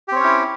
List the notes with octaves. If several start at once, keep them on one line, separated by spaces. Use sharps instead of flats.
C4 C#4 E4 G4 C#5